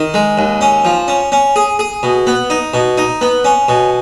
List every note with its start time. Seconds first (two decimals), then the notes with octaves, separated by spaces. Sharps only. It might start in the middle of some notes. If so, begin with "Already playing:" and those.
Already playing: D#3
0.14 G#3
0.38 D#2
0.61 C#4
0.85 F3
1.08 C#4
1.32 C#4
1.56 G#4
1.79 G#4
2.03 B2
2.27 B3
2.50 D#4
2.74 B2
2.98 D#4
3.21 B3
3.45 C#4
3.68 B2